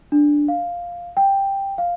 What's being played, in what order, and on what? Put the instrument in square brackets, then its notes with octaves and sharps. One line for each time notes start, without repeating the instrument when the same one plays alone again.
[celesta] D4
F5
G5
F5